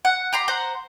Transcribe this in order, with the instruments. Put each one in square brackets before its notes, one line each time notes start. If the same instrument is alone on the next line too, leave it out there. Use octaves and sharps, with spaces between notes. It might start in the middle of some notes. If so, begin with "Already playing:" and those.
[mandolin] F#5
G4 A#5 C6
C5 F#5 A#5